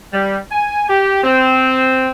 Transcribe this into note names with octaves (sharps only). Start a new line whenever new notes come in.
G3
G#5
G4
C4